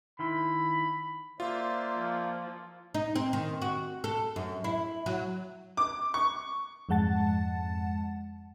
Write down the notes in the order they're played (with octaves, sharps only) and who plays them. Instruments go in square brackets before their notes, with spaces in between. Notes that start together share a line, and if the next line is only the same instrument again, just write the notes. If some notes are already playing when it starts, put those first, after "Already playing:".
[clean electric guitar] D#3 E4 C6 [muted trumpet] B5
[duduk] A#3 [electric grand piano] F4 [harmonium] C5 D5 E5
[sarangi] F3
[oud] D#4
C4
D#3
F#4
A4
F#2
E4
F#3
[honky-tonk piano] D6
C#6
[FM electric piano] F2 G#2 G#3 F#5 A5 A6